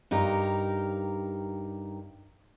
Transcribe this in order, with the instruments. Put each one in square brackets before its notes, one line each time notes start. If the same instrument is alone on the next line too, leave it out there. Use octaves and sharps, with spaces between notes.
[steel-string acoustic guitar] G2 D#4 G4 A#4